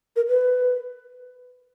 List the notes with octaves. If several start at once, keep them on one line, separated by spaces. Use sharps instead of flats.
A#4
B4